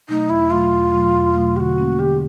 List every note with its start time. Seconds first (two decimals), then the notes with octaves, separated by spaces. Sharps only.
0.09 B2 F#3 A3 D#4
0.30 E2 E4
0.51 B2 F#3 A3 F4
0.72 E2
0.93 B2 F#3 A3
1.14 E2
1.35 B2 F#3 A3
1.56 D3 F#4 G4
1.77 G3 A#3 C#4
1.99 D3 G4